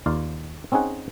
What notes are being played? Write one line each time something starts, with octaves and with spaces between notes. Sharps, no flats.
D#2 F4 D5 F5
C4 C#4 D#4 G#4 F#5